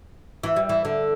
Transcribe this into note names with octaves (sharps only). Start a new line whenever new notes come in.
E3
G3
E3
D3